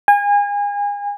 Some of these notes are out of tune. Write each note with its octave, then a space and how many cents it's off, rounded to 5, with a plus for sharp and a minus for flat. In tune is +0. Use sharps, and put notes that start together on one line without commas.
G#5 -30